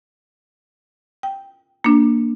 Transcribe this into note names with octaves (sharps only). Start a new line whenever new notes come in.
G5
A#3 D4